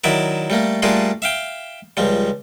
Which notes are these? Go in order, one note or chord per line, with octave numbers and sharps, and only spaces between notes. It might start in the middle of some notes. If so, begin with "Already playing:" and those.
D#3 F#3 E4 D5 E5
G3 A3 A#3
G3 A3 A#3 D4 F4 G#4
E5 F5 G5
C#2 F3 G3